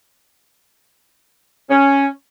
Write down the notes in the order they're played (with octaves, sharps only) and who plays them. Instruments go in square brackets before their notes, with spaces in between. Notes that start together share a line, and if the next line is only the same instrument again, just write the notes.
[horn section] C#4